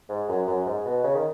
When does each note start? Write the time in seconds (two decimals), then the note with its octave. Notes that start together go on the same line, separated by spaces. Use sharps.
0.09 G#2
0.29 F#2
0.47 F#2
0.66 G#2
0.86 B2
1.04 C#3
1.15 D#3